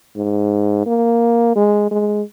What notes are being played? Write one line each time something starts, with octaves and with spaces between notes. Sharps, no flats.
G#2
A#3
G#3
G#3